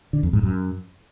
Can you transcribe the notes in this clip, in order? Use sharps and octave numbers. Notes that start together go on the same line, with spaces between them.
D3
F2
G#2
F#2